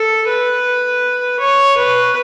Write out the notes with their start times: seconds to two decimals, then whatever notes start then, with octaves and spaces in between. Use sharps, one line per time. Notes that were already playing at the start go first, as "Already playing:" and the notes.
Already playing: A4
0.28 B4
1.40 C#5
1.77 B4